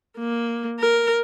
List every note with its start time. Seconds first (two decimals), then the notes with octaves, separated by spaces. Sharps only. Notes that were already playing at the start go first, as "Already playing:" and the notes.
0.18 A#3
0.80 A#4